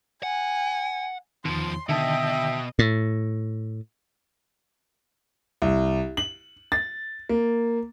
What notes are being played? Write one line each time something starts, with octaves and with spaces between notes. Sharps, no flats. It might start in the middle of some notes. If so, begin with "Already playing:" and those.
F#5 G#5
E2 B2 D#3 F3 C6
B2 D3 D#3 D#5 E5 G5 A5
A2
C2
F#7
A6
A#3